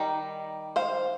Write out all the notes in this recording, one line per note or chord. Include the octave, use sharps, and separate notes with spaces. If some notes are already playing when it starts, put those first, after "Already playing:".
Already playing: D#3 G3 D#4
C5 F5